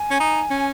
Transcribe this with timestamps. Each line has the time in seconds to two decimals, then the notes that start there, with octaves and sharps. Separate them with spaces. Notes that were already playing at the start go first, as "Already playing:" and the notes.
Already playing: G#5
0.10 C#4
0.20 D#4
0.50 C#4